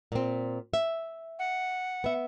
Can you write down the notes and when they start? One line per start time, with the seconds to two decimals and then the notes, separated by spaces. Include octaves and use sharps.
0.12 A#2 C4
0.74 E5
1.39 F#5
2.04 B3 E5